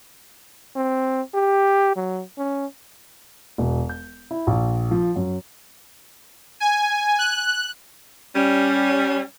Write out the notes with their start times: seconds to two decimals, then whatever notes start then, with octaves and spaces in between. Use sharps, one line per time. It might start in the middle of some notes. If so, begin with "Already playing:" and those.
0.76 C4
1.35 G4
1.96 F#3
2.38 C#4
3.58 E1
3.89 G6
4.31 E4
4.47 A#1
4.91 F3
5.16 F#2
6.60 G#5
7.19 F#6
8.36 G3 C#4